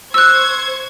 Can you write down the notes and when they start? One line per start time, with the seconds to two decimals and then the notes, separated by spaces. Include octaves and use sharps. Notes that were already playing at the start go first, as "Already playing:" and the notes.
0.14 C5 C#6 E6 F#6 G#6